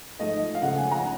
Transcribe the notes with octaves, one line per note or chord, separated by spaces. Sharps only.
G#2 F3 A3 D#5
F5
C#2 C#3 F3 A3 F#5
G#5
A#5